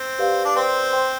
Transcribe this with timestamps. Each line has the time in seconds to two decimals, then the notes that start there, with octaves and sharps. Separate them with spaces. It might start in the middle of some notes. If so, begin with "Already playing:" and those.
Already playing: C4
0.19 G4 B4 D5 F5
0.45 D4
0.55 C4 B4 D5 G5 C6
0.92 C5 G5 C6